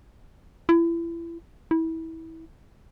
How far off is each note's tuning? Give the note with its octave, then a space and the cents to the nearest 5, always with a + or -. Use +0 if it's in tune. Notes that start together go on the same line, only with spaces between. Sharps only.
E4 +30
E4 -25